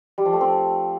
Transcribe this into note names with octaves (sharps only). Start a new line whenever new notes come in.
G3
F3
A3
C4